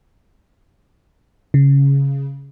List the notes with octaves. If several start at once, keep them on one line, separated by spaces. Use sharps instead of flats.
C#3